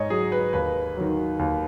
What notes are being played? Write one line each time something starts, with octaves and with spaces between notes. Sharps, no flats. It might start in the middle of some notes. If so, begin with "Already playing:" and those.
Already playing: G#2 C#5 D#5
F#3 G#4
B4
D#2 B4
D#3 F#3
D#2